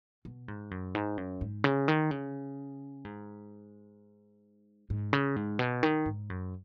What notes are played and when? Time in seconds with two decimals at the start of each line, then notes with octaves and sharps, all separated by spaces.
0.25 B2
0.48 G#2
0.71 F#2
0.95 G#2
1.17 F#2
1.41 G#2
1.64 C#3
1.88 D#3
2.11 C#3
3.05 G#2
4.90 G#2
5.13 C#3
5.36 G#2
5.59 B2
5.83 D#3
6.06 G#2
6.30 F#2